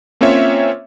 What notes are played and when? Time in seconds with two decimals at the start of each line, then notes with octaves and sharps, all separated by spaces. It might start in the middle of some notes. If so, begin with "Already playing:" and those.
0.21 A#3 C4 C#4 F4 C#5 E5